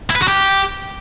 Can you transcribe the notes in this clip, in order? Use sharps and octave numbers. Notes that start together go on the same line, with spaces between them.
E4
B4
F#4
G4